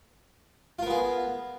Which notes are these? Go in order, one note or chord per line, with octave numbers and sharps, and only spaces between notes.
B3 F4 G#4 A#4